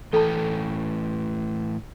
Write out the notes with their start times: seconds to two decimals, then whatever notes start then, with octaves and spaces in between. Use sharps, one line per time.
0.13 A2 E3 A4 G5 A5